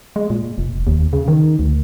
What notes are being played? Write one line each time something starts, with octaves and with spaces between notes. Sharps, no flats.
G#3
A#2
F1
D#2
C#3
D#3
D2